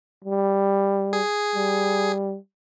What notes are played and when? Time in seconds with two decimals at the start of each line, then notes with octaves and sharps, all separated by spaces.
0.24 G3
1.13 G#4
1.55 G3